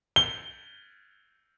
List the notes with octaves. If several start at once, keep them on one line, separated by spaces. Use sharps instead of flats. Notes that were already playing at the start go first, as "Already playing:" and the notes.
G7